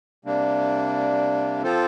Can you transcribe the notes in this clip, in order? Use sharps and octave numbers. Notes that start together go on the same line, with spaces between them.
C3 G3 A#3 D4
F3 C4 F4 A4 C5